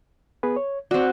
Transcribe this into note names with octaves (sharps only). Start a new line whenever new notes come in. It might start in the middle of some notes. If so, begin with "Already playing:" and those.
B3 G#4 B4
C#5
C4 F#4 D5